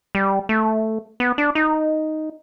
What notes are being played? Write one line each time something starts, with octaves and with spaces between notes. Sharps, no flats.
G3
A3
B3
D4
D#4